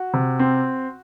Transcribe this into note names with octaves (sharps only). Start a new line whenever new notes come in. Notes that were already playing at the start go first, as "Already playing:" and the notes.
Already playing: F#4
C3
C4